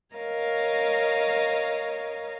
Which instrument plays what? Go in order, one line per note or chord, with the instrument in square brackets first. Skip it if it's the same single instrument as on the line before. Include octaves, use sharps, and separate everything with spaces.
[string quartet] A#4 C#5 D#5 F5